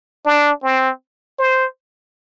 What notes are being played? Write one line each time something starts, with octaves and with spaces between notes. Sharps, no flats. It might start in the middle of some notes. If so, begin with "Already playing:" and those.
D4
C4
C5